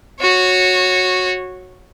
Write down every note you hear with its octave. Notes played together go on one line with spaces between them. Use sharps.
F#4 C#5